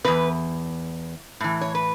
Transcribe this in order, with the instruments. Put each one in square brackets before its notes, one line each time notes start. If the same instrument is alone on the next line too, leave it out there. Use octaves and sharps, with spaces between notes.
[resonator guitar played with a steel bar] E2 B2 B4
A2 E3
C#5
B4